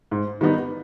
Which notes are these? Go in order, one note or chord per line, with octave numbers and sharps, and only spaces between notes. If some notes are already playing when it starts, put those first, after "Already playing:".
G#2
D#3 G3 B3 D#4